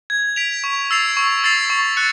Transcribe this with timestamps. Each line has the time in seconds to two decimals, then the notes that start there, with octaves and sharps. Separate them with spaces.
0.10 G#6
0.36 B6 D7 F7
0.64 C#6
0.91 E6 A6 C7 F7
1.17 C#6
1.44 E6 A6 C7 F7
1.70 C#6
1.97 F#6 A6 C#7